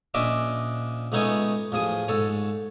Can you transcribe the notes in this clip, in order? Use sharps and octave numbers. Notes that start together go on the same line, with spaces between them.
A#1 C#4 D4 D#5 E5 D6
C#2 A3 B3 D#4 C#5 G#5
A1 F3 G#4 D#6
G#2 A4 C#5